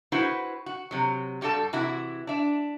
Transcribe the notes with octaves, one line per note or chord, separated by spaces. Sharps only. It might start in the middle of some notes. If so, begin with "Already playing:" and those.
E4 F#4 B4 C5 F#5
F#4
C3 F#3
G2 G3 F#4 G4 A4 A5
C3 E3 E4 F#4
D4 E5